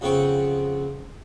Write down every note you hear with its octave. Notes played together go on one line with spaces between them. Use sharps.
F2 C#3 B3 C4 G5 C#6